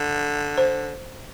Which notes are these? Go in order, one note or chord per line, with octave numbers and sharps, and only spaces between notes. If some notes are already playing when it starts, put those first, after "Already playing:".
Already playing: D3
C5